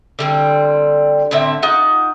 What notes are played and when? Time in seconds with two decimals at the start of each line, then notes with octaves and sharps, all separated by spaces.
0.19 D3 G3 C4
1.31 A2 D3 C4 E5
1.62 D#4 F4 F#5